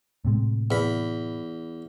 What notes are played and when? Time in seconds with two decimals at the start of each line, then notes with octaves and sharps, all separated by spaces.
0.25 A2 C3 G#3
0.71 E2 B5